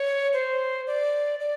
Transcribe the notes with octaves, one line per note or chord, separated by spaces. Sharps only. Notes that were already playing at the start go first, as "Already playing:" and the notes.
Already playing: C#5
C5
D5
D5